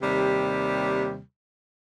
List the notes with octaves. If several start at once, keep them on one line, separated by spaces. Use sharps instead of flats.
D#2 C3 G3